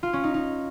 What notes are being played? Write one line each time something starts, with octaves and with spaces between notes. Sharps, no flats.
F4
C#4
D#4
D#4